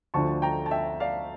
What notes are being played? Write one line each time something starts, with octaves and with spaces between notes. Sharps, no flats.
D2 D3 F3 A3 D4 A5 C#6
G5 A#5
A5
E5 G5
D5 F5